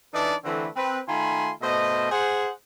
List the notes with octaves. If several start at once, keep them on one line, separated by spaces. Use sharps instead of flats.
E3 D4 D#4 A4 B4 D5
D3 E3 A3 C4 B4
C4 B4
D#3 A3 F4 G#5 B5 C6
B2 A3 C5 D#5
G#4 C5 F#5